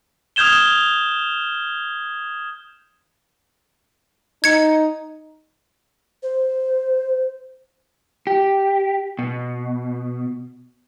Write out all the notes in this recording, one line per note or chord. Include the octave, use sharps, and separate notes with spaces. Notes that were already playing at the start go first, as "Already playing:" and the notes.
D#6 F6 G6 G#6 E7 G7
D#4 G#6 C#7
C5
G4
B2